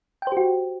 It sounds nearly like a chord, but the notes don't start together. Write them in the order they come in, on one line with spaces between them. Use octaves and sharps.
G5 C5 G4 F#4